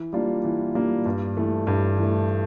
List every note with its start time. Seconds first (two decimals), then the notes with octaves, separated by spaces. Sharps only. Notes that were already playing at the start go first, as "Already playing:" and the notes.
Already playing: E3
0.13 G3 A#3 D4 F4
0.44 E3
0.75 G3 A#3 D4 F4
1.06 G2
1.37 E3 A3
1.67 G2
1.98 E3
2.03 A3